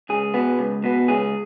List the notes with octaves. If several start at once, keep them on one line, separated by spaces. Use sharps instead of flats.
C#2 G#4
B2 B3
C#2
B2 B3
C#2 G#4